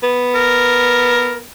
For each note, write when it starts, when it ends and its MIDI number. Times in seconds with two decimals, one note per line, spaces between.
0.03 1.47 59
0.35 1.39 70